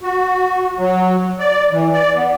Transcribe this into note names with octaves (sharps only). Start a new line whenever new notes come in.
F#4
F#3
D5
E3
D5
B3